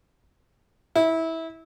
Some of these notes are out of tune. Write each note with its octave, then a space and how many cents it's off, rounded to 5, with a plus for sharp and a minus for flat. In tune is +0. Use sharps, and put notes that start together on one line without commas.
E4 -20